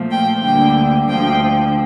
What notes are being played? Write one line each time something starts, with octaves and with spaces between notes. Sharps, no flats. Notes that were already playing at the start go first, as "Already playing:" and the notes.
Already playing: A#2 F3 A3
G5
D2 D3 G3 A#3 G5
D2 D3 F3 G5